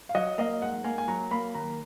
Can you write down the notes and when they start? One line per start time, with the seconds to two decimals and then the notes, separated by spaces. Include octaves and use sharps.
0.09 F5
0.15 F#3 D#5
0.38 A#3 D#5
0.62 G#2 F#5
0.84 A#3 G#5
0.98 G#5
1.08 F#3 A#5
1.31 A#3 B5
1.54 D#2 A#5